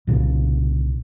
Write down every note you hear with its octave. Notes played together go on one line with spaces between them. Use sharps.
C2 A#2 C#3